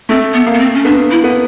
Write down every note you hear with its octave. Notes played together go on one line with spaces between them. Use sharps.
A3 C4
B3
A#3
B3
C4
C#4
B3 D4
E4
B3